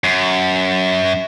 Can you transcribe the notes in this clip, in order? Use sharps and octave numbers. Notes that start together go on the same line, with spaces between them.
F#2